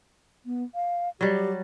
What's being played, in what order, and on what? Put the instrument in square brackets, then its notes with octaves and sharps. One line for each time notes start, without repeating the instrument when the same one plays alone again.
[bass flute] B3
F5
[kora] F#3 G3 [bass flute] G4